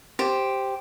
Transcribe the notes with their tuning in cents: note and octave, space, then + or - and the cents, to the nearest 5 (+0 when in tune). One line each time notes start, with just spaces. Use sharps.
G4 +0 C5 +0